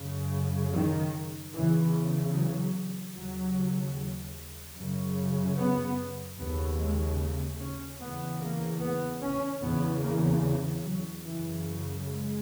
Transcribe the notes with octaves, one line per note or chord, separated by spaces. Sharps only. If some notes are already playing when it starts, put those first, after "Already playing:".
Already playing: F#2 C#3
D#3
E2 C#3 E3
F#3
D#2 C#3 F#3
F#2 C#3
B3
D#2 C#3 B3
G#3
C#4
E2 C#3 B3
A#3
B3
C#4
E2 C#3 B3
A#3
F#3
F#2 C#3 E3
G#3